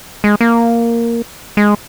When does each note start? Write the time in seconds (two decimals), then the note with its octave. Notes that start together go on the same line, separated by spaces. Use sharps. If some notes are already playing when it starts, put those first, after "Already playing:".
0.24 G#3
0.41 A#3
1.57 G#3